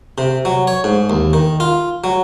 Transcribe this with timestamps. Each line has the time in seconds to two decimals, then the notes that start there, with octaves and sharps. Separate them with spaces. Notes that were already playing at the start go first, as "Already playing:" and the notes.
0.18 C3
0.45 F#3
0.67 C#5
0.84 G#2
1.10 D#2
1.33 D#3
1.60 F4
2.04 F#3